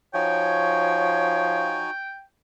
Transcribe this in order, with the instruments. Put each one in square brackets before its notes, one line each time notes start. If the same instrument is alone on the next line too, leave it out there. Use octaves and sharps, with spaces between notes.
[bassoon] F3 [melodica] D#4 F#4 G#5 [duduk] C#5 [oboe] G5